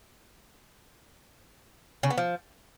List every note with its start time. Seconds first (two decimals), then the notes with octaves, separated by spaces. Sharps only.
2.03 C#3
2.10 B3
2.18 F3